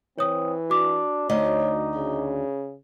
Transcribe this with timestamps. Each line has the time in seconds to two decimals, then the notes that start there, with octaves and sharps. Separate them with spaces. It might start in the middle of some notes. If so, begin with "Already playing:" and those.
0.19 E3 C4 C#5 D#6
0.70 D4 F#4 D6
1.29 D2 D#4 C#5 D#5
1.96 C#3